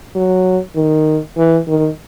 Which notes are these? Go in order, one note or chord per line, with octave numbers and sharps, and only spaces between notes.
F#3
D#3
E3
D#3